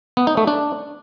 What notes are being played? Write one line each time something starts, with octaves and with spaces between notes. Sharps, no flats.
B3
D#4
A3
D4